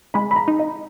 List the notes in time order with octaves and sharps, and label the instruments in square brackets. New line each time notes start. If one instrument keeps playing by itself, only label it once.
[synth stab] G#3 [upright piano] B5
[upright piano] B5
A#5
[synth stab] D#4
[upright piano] D#5